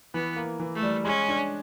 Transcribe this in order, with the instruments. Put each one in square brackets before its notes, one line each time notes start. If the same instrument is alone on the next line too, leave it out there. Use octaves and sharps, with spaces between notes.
[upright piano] E3 [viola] B3
[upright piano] A#3
E3
[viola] A3
[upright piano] G3
[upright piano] G#3 [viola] C#4
[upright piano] D4